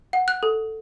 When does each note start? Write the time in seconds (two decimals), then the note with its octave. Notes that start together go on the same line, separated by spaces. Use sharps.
0.13 F#5
0.28 F#6
0.43 A4